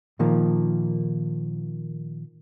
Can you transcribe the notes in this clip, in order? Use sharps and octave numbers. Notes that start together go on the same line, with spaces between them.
A#2 D#3 F3 A#3